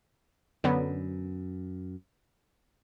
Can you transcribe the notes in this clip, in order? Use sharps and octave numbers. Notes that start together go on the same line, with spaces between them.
F#2 D3 F#3 B3